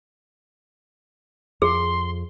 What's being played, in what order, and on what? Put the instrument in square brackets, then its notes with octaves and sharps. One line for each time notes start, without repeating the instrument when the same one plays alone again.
[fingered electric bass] F2 [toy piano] G#4 [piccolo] C6